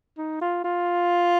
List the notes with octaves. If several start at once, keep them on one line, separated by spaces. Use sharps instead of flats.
D#4
F4
F4